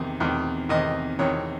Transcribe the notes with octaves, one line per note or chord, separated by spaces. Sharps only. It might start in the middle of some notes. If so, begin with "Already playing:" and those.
Already playing: E2 C3 D#3
E2 C3 D#3
E2 C3 D#3 D#5
E2 C3 D#3 C#5